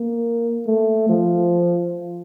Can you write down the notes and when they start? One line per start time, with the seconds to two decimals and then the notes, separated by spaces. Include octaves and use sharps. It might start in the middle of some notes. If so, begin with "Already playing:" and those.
Already playing: A#3
0.67 A3
1.09 F3